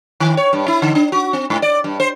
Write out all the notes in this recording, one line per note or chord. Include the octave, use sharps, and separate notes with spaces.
D#3
C#5
G2
E4
D3
D4
F#4
C4
G#2
D5
G2
C5